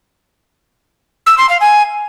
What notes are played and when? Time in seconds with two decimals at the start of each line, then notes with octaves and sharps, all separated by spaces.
1.26 E6
1.38 C6
1.49 F5
1.61 G#5